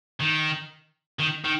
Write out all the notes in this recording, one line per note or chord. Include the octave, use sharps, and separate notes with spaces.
D#3
D#3
D#3